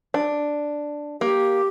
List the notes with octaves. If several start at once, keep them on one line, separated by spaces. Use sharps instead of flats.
D4
A#3 G4